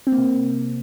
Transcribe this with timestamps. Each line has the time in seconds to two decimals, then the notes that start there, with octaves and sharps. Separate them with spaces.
0.07 C4
0.12 A#3
0.18 C3